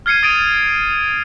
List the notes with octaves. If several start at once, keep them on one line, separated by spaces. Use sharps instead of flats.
F6 G#6 C7 C#7 D#7
D#6 A6 D7 D#7 F7